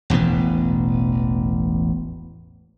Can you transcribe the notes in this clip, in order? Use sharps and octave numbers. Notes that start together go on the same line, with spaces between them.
E1 A1 B2 B3